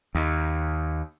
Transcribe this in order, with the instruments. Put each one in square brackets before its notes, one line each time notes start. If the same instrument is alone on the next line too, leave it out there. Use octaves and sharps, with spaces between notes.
[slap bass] D#2